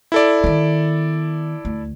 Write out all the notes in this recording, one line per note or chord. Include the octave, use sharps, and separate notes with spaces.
E4 A4 D5
D#3 B3
D2